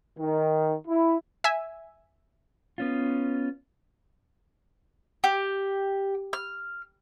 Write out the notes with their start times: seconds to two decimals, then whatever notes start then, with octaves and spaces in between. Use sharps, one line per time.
0.19 D#3
0.88 E4
1.44 E5 G#5
2.78 B3 C#4 F4
5.24 G4
6.33 F6